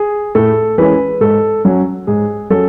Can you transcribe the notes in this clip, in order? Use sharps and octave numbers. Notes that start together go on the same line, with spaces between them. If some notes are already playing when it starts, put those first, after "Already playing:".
Already playing: G#4
A2 A4
E3 G#3 C#4 B4
G#2 A4
F#3 C#4
G#2 G#4
F#3 C#4 A4